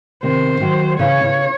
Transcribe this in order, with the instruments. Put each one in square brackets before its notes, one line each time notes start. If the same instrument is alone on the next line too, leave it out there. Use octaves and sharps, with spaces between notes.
[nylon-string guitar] C3 D#3 [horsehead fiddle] C5
[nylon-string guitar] D#3 F#3
[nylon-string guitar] C#3 E3 [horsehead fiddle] C#5
[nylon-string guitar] C#3